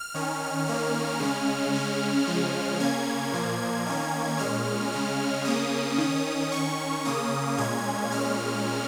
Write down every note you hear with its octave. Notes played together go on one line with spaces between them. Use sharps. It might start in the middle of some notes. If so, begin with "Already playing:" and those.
Already playing: F6
D#3 C#4
D#3 A#3 C#4
C#3 G#3 C#4 F6
C#3 G#3 C#4
C#3 F3 G#3 C#4
C#3 A#3 C#4 G#6
A#2 F3 A#3
D#3 A#3 C#4
A#2 G#3 C#4 F6
C#3 G#3 C#4
C#3 A#3 C#4 D#6
D#3 C#4
D#3 C#4 C#6
C#3 A#3 C#4 D#6
A#2 G#3 C#4 G#6
A#2 G#3 C#4 F6